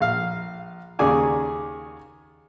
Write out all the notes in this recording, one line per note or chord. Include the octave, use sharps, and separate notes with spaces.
A#1 F5
D#2 C#3 G#4 D5 G#5 D6